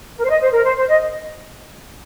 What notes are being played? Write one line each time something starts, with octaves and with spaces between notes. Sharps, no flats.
A#4
C5
D#5
C5
A#4
C5
C5
D#5